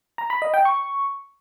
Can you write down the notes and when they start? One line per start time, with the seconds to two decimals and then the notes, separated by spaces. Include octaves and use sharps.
0.18 A#5
0.30 B5
0.42 D#5
0.54 G5
0.65 C#6